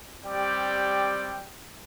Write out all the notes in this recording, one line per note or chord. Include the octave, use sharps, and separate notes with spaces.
G3 C4 G4 D5 G5